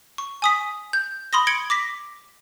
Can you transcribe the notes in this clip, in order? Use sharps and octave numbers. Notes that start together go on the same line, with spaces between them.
C#6
G#5 D#6 B6
G6
B5 C6 D#6 A#6
G#6 C#7 D7 F#7 G7
D6 A#6 B6